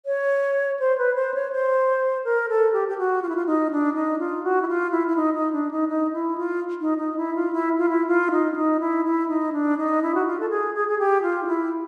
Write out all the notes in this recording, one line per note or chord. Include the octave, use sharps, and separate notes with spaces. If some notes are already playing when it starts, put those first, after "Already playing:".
C#5
C5
B4
C5
C#5
C5
A#4
A4
G4
G4
F#4
F4
E4
F4
D#4
D4
D#4
F4
F#4
E4
F4
E4
E4
D#4
D#4
D4
D#4
D#4
E4
F4
D#4
D#4
E4
F4
E4
F4
E4
F4
D#4
D4
D#4
E4
E4
D#4
D4
D#4
E4
F#4
F4
A4
G#4
G#4
G#4
G4
F4
D#4
E4